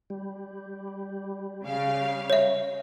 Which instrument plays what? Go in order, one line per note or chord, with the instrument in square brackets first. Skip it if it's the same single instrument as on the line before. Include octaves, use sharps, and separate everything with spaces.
[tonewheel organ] G3
[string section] C#3 F5
[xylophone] C#5 E5